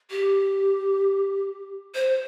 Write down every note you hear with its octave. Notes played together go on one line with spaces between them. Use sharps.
G4
C5